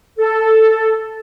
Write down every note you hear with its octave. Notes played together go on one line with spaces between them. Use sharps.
A4